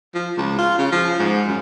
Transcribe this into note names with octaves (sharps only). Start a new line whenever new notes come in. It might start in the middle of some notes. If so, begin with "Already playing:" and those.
F3
C#2
F4
C#3
F3
G#2
F#2